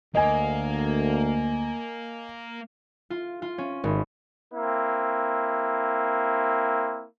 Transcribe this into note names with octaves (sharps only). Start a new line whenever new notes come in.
D2 A#3 D#5 G#5
F4
F4
C#4
G#1
A#3 C4 E4